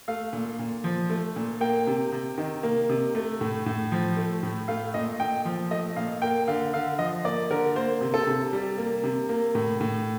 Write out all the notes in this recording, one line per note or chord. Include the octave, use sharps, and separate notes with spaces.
A3 F5
A#2
A#2
F3
A3
A#2
A#3 G5
C3
C3
D#3
A#3
C3
A3
A2
A2
F3
A3
A2
A3 F5
A#2 D#5
A#2 G5
F3
A3 D#5
A#2 F5
A#3 G5
D3 F5
D3 F5
F3 D#5
A#3 D5
D3 A#4
A#3 C5
C3
A4
C3
G3
A#3
C3
A#3
A2
A2